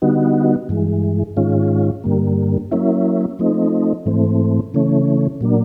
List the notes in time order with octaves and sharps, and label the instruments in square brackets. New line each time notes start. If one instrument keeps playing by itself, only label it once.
[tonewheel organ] D3 G3 B3 D#4 F#4
G2 E3 G#3
G#2 D#3 G#3 C#4 F4
G2 D3 G3 A#3
F#3 A#3 C#4 E4
F3 A3 C4 D#4
G#2 E3 A3 C4
C#3 E3 A3 C#4
A#2 F#3 A#3 D4